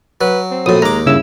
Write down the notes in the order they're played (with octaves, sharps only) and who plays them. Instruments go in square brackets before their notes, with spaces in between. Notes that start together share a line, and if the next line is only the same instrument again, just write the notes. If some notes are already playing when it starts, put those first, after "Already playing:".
[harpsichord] F#3 [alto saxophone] B4
[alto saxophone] C4
[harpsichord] A#1 A2 [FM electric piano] F#3 D#6
[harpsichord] D#2 D6 [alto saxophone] G#3 [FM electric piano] A#5
[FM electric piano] G2 C#3 E6 [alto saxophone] E4